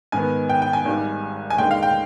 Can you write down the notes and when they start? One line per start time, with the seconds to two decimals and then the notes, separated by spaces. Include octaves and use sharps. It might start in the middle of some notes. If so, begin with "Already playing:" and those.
0.12 G#2 D#3 B3 G#5
0.49 G5
0.62 G5
0.73 G#5
0.85 G#1 G#2 G3
1.50 G#5
1.58 D#2 D3 G#3 G5
1.71 F5
1.83 G5